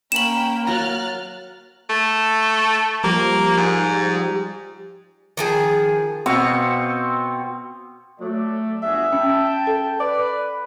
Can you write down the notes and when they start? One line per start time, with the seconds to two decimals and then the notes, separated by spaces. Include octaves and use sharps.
0.12 A#3 C#4 G5 B5 E7 F#7
0.67 F#3 A#5 F6 F#6 A6
1.90 A3
2.43 C#6
3.04 F3 G3 A#3 G4
3.57 G#2
5.37 D#3 F3 G#4
6.26 B2 C4 F5 C#6
8.20 F#3 A3 D5
8.83 G1 F#4 G#4 E5
9.13 C#4 G5 A5
9.67 A4
10.00 B4 D5